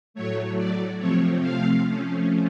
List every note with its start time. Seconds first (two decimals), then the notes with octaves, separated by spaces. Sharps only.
0.14 A2 F#3 A3 C#5
0.57 D5
0.99 C3 F3 A3 C4 C#5
1.40 F5
1.83 F3 A3 C#4